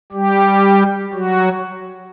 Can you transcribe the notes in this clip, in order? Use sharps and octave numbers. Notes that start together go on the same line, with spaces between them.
G3 G4
F#3 F#4